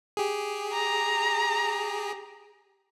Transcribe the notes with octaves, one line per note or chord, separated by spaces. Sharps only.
G4 G#4
A#5